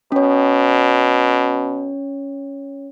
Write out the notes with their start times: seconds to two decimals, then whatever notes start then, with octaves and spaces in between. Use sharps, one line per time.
0.12 B2 C#4 C#5